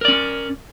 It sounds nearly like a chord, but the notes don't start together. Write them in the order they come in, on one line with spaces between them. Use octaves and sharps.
A#4 D5 C#4